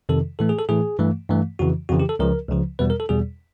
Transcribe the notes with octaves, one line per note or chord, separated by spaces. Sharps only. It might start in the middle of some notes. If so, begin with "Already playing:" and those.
F2 C3 D#3 A4
A2 E3 A3 A4
G#4
A4
A2 E3 A3 G#4
G2 E3 A3
G2 E3 A3
F2 C#3 E3 F#4
F2 C#3 E3 F#4
G4
A4
C#2 C#3 F3 A#4
C#2 C#3 F3
E2 B2 G3 B4
A#4
A4
E2 B2 G3 G#4